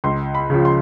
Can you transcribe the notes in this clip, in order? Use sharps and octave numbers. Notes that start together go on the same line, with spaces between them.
C#2 C6
B5
C#3 F3
C6